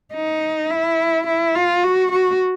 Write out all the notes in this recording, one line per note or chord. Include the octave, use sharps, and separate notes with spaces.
D#4
E4
E4
F4
F#4
F#4